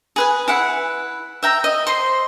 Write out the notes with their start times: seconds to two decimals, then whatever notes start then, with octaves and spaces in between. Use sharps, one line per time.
0.16 G#4 B4 G#5
0.48 E4 B4 F#5
1.43 E5 G5 A#5
1.64 D#5
1.87 C5 D#5 C6